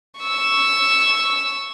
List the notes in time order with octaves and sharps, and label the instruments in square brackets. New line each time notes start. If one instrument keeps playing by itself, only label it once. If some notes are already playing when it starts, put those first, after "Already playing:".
[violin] C#6 E6